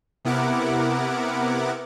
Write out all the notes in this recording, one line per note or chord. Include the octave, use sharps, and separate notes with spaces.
C3 B3 E4 A#4 F#5 D6